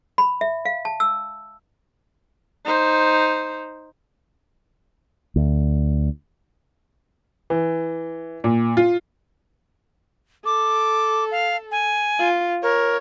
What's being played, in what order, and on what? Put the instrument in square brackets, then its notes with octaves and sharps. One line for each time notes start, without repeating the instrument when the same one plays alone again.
[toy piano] B5
E5
F5
A5
E6
[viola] D#4 C5
[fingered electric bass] D2
[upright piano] E3
A#2
F4
[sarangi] A4 [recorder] D6
[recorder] F5
G#5
[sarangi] F4
[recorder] A#4 [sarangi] C#5